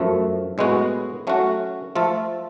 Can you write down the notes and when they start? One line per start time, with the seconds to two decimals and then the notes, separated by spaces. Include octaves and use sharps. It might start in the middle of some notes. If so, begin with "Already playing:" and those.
Already playing: F#2 F3 A3
0.58 A2 G#3 B3 F#4
1.27 F#3 A3 C#4 F#4
1.96 F3 A3 F4 A4